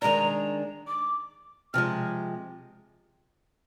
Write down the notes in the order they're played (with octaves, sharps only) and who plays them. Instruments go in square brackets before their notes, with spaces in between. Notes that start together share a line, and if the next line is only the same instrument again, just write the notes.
[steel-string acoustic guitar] D#3 G#3 D4 [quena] A#5
[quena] D6
[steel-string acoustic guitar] C3 F3 G#3 [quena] F6